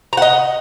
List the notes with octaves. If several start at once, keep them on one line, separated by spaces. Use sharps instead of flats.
D#5 F#5 A#5